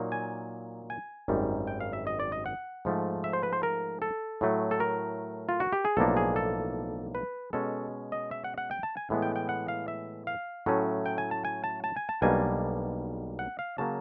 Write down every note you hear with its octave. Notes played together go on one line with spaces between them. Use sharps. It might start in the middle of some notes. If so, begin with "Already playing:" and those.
Already playing: A#2 F#3 A#3 D#4
G#5
G#5
G#1 F#2 D#3 G3
G5
F5
E5
D#5
D5
D#5
F#5
G#2 F3 A3
E5
C5
B4
C5
A#4
A4
A2 F#3 A3
A4
A#4
F4
F#4
G4
G#4
B1 A2 F3 A#3 D4 A4
G#4
A4
B4
B2 G#3 C#4 A4
D#5
E5
F#5
F#5
G5
A5
G#5
A2 E3 G#3 B3
G5
G5
F#5
F5
E5
F5
A2 F#3 A3 C#4
G5
G#5
A5
G#5
A5
A5
G#5
A5
B1 B2 G3 A#3 D4 G#5
F#5
F5
C#3 F#3 A#3 A5